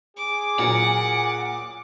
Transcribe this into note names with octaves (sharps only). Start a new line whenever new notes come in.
G#4 D6
A#2 F#3 F#5